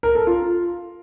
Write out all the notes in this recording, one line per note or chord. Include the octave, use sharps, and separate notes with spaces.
A#4
A4
F4